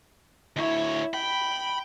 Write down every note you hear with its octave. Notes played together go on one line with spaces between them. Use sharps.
D2 E4 C#5
G5 B5